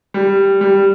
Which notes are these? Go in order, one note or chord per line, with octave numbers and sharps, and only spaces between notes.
G3
G3